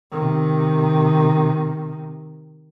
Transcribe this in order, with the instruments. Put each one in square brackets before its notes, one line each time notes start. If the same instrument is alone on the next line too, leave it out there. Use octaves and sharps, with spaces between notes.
[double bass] C3 D#3